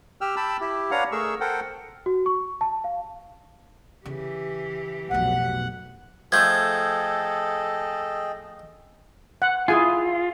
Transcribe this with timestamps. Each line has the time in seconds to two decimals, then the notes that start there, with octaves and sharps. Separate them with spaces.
0.21 G4 G5 E6 F6
0.36 G5 A5 B5 E6
0.61 E4 G4
0.91 D4 B4 C#5 F5 F#5 A#5
1.12 A3 G#4 A#4 C#6 E6
1.40 A4 A#4 C5 F#5 G5
2.06 F#4
2.26 C#6
2.61 A5
2.84 F5
4.05 C#3 E3 G4
5.11 B1 F2 A2 F#5
6.32 F3 A3 G#4 A4 D#5 G5 G6 G#6
9.42 F#5
9.68 E4 F4 G#4 G#5